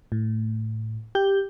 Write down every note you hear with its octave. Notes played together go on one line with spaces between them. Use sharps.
A2
G4 G6